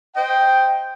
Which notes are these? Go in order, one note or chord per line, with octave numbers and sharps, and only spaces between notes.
C5 D#5 G5